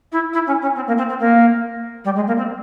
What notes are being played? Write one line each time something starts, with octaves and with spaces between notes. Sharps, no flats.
E4
E4
C#4
C#4
C4
A#3
C4
C4
A#3
G3
G#3
A#3
C4